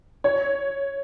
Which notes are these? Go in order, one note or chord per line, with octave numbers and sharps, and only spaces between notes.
C#5